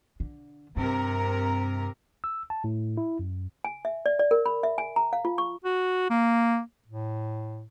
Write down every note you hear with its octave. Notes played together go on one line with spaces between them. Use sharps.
D3
G2 C3 A#4
E6
A5
A2
E4
F#2
G#5
E5
D5
D5
A#4
B5
E5
G#5
A#5
F5
F4
C#6
F#4
A#3
A2